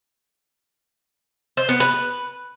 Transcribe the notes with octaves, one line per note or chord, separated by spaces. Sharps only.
C5
B3
B4